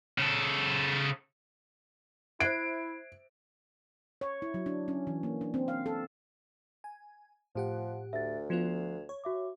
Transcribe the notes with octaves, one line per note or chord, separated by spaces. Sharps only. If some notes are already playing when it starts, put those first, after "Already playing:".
C#3 A4
E4 C5 E5 F#6 G#6 C7 D7
C#5
E4
F#3
D4
C#4
E3
A#3
D4
C4
F5
A4
G#5
A2 F3 G4 F#5
D2 E5 A6
F3 B3 F4 G#6 E7 F7
C#5
F#4 E5 D6